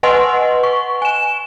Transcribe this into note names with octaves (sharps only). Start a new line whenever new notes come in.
B4 D#5 F#5 G#5 C6
C#6
G#5 E7